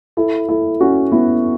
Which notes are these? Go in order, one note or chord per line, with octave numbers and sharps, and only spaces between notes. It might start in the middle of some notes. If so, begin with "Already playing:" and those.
E4 A4
E4 A4
C#4 F#4
B3 E4